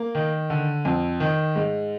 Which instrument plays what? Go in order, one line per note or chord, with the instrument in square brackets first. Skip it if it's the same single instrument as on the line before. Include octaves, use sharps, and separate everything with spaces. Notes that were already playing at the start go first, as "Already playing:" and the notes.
Already playing: [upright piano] A#3
D#3
D3
F2
D#3
G#2